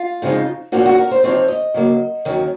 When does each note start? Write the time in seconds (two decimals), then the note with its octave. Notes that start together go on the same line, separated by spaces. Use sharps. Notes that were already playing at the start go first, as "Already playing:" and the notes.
Already playing: F4
0.22 F2 C#3 F3 G#3 D#4
0.72 A#2 F3 A#3 C#4 F#4
0.86 F#4
0.98 A#4
1.11 C5
1.23 C3 F3 C4 D#4 C#5
1.48 D#5
1.74 C#3 F#3 A#3
2.25 D#2 D#3 F#3 A#3 C#4